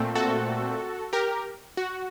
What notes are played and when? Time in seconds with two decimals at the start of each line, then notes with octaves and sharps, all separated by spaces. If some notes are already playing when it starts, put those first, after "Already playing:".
Already playing: A#2 A3 C4
0.15 F#4 A4
1.13 G4 A#4
1.77 F#4